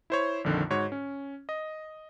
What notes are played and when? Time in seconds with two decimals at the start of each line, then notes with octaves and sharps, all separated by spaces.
0.10 E4 C5 C#5
0.44 A#1 F2 D3 D#3
0.70 G#2 F#4 C#5
0.92 C#4
1.49 D#5